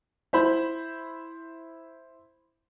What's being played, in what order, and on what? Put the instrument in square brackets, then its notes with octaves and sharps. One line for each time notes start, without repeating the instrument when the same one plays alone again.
[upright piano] E4 C5 B5